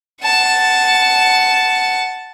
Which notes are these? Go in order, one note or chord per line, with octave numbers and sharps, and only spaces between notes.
F#5 A5